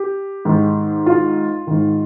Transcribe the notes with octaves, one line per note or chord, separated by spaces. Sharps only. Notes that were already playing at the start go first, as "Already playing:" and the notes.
Already playing: G4
G#2 D#3
F4
G#2 D#3